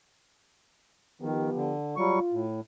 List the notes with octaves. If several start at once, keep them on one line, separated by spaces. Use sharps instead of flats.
D#3 F3 B3 G4
D3
F#3 G3 F4 C#6
A2